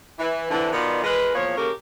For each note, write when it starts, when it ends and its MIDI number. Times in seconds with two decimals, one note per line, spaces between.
0.19 0.48 52
0.50 0.71 50
0.50 0.71 52
0.50 0.71 60
0.73 1.00 47
0.73 1.00 51
0.73 1.00 59
0.73 1.00 65
0.73 1.00 74
1.03 1.32 52
1.03 1.32 56
1.03 1.32 70
1.03 1.32 71
1.35 1.53 40
1.35 1.53 46
1.35 1.53 53
1.35 1.53 73
1.56 1.70 49
1.56 1.70 58
1.56 1.70 66
1.56 1.70 67
1.56 1.70 69
1.56 1.70 70